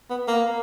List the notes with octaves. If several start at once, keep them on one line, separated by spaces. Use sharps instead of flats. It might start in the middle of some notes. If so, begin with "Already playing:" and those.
B3
A#3